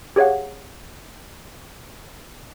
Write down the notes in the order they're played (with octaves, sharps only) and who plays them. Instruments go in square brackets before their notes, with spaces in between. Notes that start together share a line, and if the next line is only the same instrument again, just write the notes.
[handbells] G4 G#4 C#5 F5 F#5